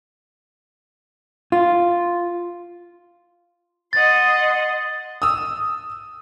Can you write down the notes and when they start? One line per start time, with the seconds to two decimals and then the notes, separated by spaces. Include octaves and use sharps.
1.52 F4
3.93 D#5 F#5 C6 A6
5.22 D#6 E6